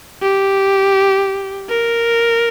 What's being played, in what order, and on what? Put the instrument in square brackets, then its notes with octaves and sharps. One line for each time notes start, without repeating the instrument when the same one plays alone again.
[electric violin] G4
A#4